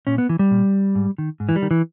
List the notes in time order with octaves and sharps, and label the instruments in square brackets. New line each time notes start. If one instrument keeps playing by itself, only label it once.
[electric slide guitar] A#2 C#4
B3
E3
G3
A#2
G#2
D#3
G#2
E3
G3
D#3
E3